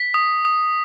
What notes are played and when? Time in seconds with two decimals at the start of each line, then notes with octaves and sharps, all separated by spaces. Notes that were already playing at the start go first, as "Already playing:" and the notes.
Already playing: B6
0.14 D#6
0.45 D#6